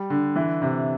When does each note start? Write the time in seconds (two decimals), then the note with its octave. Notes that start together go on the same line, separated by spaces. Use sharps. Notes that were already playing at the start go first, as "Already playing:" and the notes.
Already playing: G3
0.10 D3
0.36 E3
0.62 C3